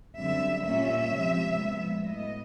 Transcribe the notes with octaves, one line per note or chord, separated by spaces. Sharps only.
F#2 D3 G3 C4 E5
A#2 G3 A#3 C#4 E5
C3 F3 G#3 C4
A#2 F3 G#3 B3
A2 F#3 B3 D#5